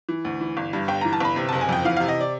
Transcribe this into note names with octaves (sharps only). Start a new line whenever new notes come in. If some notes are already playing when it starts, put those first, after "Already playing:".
E3
D2
E3
G1
G2
G1 G5
E3 A#5
A5
G1 B5
C3
F#1 A5
G#5
F2 G5
E3 F5
C3 F5
D#5
D5